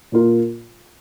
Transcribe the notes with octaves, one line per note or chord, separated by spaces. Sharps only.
A#2 A#3 F4 A#4